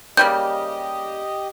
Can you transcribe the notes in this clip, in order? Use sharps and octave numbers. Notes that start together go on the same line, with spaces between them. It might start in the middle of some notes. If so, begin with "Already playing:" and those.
C#3 G3 A#3 G4 D#5 G6